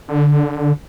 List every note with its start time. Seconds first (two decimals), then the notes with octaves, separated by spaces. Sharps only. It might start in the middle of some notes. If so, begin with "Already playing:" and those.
0.08 D3